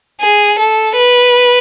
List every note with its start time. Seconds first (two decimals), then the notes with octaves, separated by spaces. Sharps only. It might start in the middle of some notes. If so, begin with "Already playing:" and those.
0.21 G#4
0.59 A4
0.97 B4